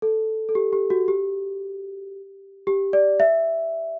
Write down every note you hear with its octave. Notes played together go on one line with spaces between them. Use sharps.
A4
A4
G4
G4
F#4
G4
G4
D5
E5